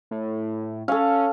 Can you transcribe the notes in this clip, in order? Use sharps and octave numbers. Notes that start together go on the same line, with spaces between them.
A2
C#4 A4 F5